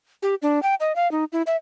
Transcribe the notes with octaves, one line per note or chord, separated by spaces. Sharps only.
G4
D4
G5
D#5
F5
D#4
E4
E5